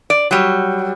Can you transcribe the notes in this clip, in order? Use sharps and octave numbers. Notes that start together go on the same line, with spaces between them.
D5
F#3 G3